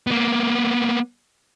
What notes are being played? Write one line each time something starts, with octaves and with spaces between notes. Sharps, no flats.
A#3 B3